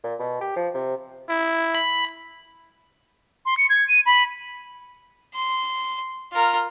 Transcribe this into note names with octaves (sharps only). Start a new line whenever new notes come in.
A#2
B2
G4
F3
C3
E4
B5
C6
C#7
G#6
D#7
B5
C6
F4 A#4